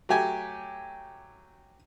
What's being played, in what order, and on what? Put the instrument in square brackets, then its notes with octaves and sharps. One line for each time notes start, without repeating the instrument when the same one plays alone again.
[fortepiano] F#3 A3 G4 G#5